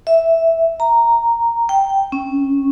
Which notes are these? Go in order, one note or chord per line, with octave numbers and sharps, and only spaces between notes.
E5
A#5
G5
C#4